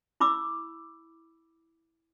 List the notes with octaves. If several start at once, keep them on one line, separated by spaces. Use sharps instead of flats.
E4 B5 D6 E6